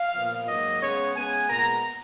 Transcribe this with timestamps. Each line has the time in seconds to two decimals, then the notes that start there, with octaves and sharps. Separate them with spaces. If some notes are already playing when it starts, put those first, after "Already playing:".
Already playing: F5
0.14 A#2 F3 B3
0.47 G#2 F#3 A#3 D#5
0.81 C#3 G#3 B3 C#5
1.15 C#3 G#3 B3 G#5
1.49 A#2 G#3 B3 A#5